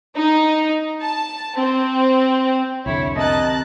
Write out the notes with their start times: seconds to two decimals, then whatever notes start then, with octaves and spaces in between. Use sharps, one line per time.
0.16 D#4
1.02 A5
1.57 C4
2.86 C2 F2 D3 E4 C#5
3.16 C3 A#4 D#5 A5 F#6 A6